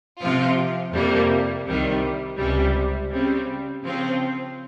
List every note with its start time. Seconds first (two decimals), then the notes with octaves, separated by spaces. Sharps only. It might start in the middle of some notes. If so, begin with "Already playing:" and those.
0.21 C3 F3 C4 F4
0.94 F2 C3 G3 A#3
1.65 C2 C3 D#3 G3
2.38 C#2 C3 G3
3.10 C#3 G3 C4
3.83 C#3 F3 C4 F4